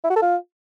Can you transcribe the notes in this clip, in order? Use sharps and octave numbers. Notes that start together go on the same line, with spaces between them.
E4
F#4
A4
F4